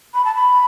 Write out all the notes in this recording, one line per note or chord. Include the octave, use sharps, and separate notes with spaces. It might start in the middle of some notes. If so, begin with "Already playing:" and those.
B5
A5
B5